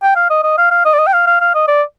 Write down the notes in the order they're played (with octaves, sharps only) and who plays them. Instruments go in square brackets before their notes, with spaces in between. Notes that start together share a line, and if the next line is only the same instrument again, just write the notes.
[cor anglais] G5
F5
D#5
D#5
F5
F5
D#5
D5
D#5
G5
F5
F5
F5
D#5
D5